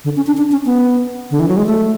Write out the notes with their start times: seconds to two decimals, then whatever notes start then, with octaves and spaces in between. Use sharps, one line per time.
0.04 D3
0.16 C#4
0.27 D4
0.37 D4
0.52 C#4
0.65 B3
1.31 D3
1.40 E3
1.48 F#3
1.57 G#3
1.66 A3